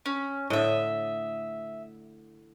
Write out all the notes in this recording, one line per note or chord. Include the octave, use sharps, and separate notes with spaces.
C#4
A2 D3 D#5 E5